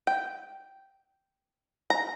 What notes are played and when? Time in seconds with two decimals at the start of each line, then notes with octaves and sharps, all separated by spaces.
0.07 G5
1.90 A#5